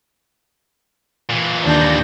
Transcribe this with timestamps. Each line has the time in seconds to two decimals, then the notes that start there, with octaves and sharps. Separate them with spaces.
1.30 A#2 E3
1.65 D#2 D4 G6 A#6